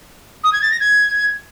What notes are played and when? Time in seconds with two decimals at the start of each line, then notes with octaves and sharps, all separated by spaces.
0.44 D#6
0.53 G#6
0.62 A6
0.71 A#6
0.80 G#6